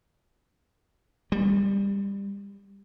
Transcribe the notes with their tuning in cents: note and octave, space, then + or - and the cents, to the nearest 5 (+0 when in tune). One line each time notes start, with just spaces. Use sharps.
G3 +20